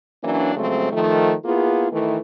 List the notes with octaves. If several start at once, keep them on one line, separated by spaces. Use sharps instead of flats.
E3 F#3 A#3 C#4 D4
C#3 F3 F#3 G#3 A3 C4
D#3 F3 A3
A#3 B3 E4 F4 G#4
D#3 E3 A3